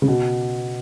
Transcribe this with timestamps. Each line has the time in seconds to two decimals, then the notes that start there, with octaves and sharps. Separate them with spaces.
0.02 C#3
0.08 B2